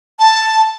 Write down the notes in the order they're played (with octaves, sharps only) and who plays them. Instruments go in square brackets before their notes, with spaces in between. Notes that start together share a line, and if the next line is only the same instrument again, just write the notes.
[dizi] A5